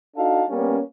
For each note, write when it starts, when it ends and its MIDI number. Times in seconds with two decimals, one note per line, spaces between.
0.15 0.43 62
0.15 0.43 63
0.15 0.43 66
0.15 0.43 69
0.15 0.43 77
0.15 0.43 81
0.49 0.79 55
0.49 0.79 58
0.49 0.79 59
0.49 0.79 61